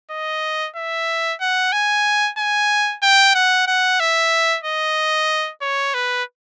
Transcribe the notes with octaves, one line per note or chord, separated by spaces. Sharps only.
D#5
E5
F#5
G#5
G#5
G5
F#5
F#5
E5
D#5
C#5
B4